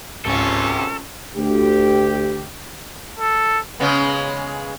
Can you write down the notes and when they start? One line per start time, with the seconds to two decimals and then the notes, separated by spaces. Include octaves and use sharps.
0.25 G#1 C#2 G#2 C3 C#4 F4 A4
1.36 D2 G4
3.19 A4
3.80 C#3 G#3 B3